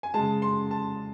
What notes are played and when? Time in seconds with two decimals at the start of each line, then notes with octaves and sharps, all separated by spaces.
0.03 G#5
0.14 C#3 G#3 A5
0.42 C6
0.71 A5